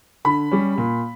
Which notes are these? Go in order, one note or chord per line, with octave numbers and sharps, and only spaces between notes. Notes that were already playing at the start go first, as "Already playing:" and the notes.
D3 B5
G3 C#4
A#2